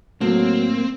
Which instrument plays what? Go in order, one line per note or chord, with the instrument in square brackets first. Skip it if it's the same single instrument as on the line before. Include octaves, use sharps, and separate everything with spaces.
[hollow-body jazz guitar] A2 [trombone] F#3 [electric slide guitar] A#3 [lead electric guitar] C4